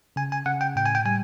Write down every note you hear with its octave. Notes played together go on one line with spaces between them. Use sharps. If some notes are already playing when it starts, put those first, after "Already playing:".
C#3 G#5
G#5
C#3 F#5
G5
A2 G5
G#5
G5
G3 G#5